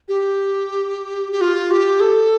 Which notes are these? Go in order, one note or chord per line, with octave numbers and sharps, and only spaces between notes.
G4
G4
F4
G4
A4